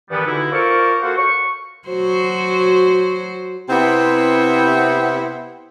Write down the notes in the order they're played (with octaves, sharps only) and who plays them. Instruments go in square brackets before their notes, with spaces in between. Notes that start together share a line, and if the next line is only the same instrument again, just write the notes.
[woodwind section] G2 D#3 E3 G3 B3
B2 D3 D#4 E4
F4 A#4 C5 D5 C#6
A#3 F#4 A4 C5 F5 F#5
C#6
[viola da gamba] F#3 F#4 C5
[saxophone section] C3 B3 C4 E4